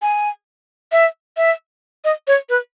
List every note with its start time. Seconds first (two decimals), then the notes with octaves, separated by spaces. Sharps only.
0.02 G#5
0.92 E5
1.37 E5
2.04 D#5
2.27 C#5
2.49 B4